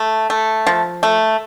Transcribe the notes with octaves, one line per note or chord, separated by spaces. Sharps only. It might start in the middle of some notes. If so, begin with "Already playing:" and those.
Already playing: A3
A3
F3
A3